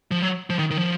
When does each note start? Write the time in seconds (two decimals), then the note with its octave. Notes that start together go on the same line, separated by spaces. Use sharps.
0.11 F3
0.22 F#3
0.50 F3
0.59 D#3
0.71 D#3
0.77 F3